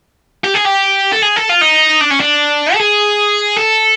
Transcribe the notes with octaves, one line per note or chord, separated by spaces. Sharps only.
G4
G#4
G4
A4
G#4
A4
F4
D#4
D4
C#4
D4
A4
G#4
A4